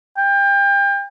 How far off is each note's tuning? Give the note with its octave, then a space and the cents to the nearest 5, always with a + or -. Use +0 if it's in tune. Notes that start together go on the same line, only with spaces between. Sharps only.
G5 +30